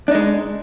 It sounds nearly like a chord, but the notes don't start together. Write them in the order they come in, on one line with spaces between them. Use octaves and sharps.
D4 D#4 G#3